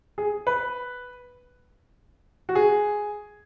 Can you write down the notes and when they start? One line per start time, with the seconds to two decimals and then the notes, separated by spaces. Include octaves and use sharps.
0.18 G#4
0.47 B4
2.49 F#4
2.55 G#4